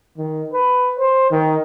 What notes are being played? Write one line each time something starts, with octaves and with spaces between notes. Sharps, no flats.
D#3
B4
C5
D#3